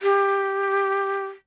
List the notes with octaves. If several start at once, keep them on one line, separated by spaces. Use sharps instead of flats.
G4